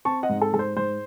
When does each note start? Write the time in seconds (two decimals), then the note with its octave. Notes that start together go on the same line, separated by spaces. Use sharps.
0.05 C4 A5 C#6
0.23 D#5 F#5
0.29 G#2
0.42 A4
0.53 G#2 A4
0.59 C5
0.76 G#2 C5